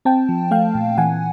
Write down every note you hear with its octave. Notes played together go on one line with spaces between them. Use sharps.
C4 G5 A5
F3
A3 F5 G5
A#2
E3 F#5 G#5